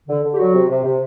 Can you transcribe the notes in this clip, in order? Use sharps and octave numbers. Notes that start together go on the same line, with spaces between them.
D3
D3
G4
F#3 F#4
C3
C3
C3